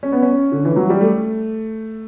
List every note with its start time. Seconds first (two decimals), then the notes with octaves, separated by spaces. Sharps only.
0.03 C#4
0.12 B3
0.22 C#4
0.52 D3
0.65 E3
0.76 F#3
0.89 G3
1.01 A3